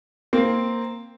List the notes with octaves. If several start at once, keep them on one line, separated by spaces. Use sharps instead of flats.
A#3 C4